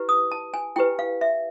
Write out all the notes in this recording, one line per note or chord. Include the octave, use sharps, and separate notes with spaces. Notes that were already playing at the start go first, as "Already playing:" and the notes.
Already playing: E4 G4 B4
D#6
A5
G#5
E4 G4 B4 G5
F5
E5